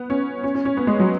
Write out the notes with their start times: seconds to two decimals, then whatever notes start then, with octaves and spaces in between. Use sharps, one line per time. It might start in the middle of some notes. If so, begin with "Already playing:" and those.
Already playing: B3
0.10 C#4
0.43 C#4
0.55 C#4
0.65 C#4
0.77 B3
0.87 G#3
0.99 F#3